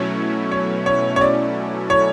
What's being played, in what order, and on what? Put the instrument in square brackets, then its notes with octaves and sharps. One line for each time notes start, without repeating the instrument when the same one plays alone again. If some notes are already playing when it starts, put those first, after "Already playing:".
Already playing: [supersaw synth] B2 F#3 A3 C#4 E4 [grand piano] C#5
[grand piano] C#5
C#5
C#5
D5
C#5